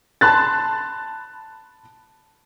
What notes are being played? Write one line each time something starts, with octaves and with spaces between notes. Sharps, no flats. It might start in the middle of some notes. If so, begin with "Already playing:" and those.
A5 B5 C6 F#6 A6